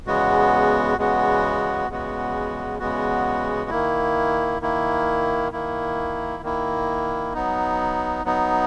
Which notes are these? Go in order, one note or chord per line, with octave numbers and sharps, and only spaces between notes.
E2 C#3 G#3 B3 F#4
E2 C#3 G#3 B3 F#4
E2 C#3 G#3 B3 F#4
E2 C#3 G#3 B3 F#4
D#3 A#3 E4
D#3 A#3 E4
D#3 A#3 E4
D#3 A#3 E4
F#3 B3 D#4
F#3 B3 D#4